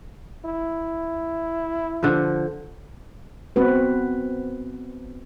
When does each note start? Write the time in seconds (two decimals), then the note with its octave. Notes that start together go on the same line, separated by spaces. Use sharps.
0.45 E4
2.03 D3 F3
3.56 B3 C4 F#4 B4